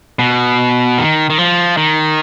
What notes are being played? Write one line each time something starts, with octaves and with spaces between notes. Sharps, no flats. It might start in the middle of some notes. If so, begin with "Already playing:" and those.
B2
D#3
D#3
F3
D#3